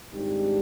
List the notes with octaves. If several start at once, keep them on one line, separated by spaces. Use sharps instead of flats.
G#1 G#2 G3 D4 G4